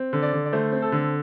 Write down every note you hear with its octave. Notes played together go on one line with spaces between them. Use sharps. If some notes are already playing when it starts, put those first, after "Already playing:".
Already playing: C4
D3
D5
D3
D5
A3 C5
C4
A4
D3